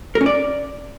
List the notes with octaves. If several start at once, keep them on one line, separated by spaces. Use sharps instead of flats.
A#4
C#4
D5